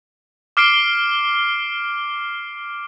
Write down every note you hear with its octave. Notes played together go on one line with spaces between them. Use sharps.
D6 F6 C7 D7 G7